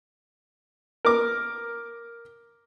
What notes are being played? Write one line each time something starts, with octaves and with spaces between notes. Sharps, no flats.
A#4 D6